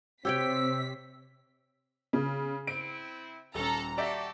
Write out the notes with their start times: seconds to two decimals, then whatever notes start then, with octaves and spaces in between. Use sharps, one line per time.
0.25 C3 C4 G4 C#5 G5 E6 B6
2.13 C#3
2.67 C4 E4 D7
3.55 D#1 C#4 A4 A#5
3.98 F#4 G4 A4 D5 E5